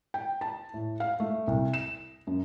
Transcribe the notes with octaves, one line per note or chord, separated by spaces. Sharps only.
G5
A5
A2
F5
A3
C2
E7
F#2